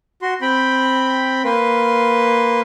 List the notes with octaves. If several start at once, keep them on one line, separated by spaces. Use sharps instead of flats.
F#4 C6
C4 G5 B5
A#3 B4 C6